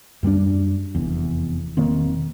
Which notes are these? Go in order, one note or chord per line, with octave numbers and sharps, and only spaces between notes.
F#2 G3 A3 D4
F1 E2
E1 D#3 A#3 C4